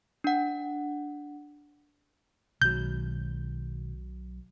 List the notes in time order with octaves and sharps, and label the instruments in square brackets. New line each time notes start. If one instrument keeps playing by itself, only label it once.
[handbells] D4 F#5
[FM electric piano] B1 F#3 [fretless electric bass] B2 D#3 G#3 [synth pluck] G6